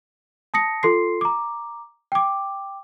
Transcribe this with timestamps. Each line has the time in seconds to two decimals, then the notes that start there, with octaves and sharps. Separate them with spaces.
0.54 A5 D#6 A#6 C#7
0.83 F4 A4 C6 C7
1.21 A#5 D6
2.12 G5 D6